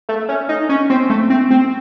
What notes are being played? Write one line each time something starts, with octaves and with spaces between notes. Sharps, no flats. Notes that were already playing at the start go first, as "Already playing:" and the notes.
A3
C#4
D#4
C#4
C4
A3
C4
C4